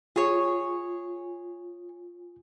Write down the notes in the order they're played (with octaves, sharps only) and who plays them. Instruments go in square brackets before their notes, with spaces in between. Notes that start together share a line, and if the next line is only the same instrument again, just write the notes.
[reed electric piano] F4 [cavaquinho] G#4 C#5